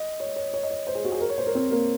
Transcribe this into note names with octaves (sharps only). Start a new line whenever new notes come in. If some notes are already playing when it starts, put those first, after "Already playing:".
Already playing: D#5
C#5
C#5
C#5
D#5
C#5
C5
G#4
F#4
G#4
A#4
C#5
C5
A#4
C4
A#3